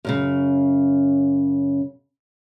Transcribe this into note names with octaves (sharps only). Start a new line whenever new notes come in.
F#2 A2 C#3